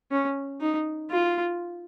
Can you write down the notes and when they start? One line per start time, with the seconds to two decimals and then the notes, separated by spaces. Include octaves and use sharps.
0.11 C#4
0.61 D#4
1.10 F4